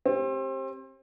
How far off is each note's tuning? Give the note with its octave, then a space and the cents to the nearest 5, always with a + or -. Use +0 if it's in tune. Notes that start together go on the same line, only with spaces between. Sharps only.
C4 +30 G4 +0